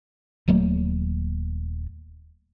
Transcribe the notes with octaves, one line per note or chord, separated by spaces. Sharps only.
D#1 F#3 A3 A#3